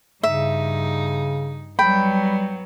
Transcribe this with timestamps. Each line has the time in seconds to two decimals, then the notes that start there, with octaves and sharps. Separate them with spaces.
0.23 G2 C#3 D#4 E5
1.79 F#3 G3 B3 G5 B5